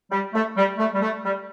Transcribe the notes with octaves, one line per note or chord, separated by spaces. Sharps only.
G3
A3
G3
A3
G3
A3
G3